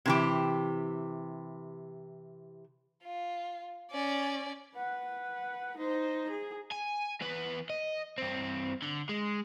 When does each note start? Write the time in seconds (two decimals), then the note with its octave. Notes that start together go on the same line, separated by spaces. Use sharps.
0.06 C3 E3 G4
3.03 F4
3.91 C#4 D5
4.74 B4 F#5
5.77 D#4 C5
6.30 G#4
6.72 G#5
7.21 E2 B4
7.70 D#5
8.18 G2 C4
8.82 D3
9.09 G#3